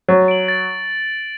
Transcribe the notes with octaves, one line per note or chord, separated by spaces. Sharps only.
F#3 A6
D7 F#7
A6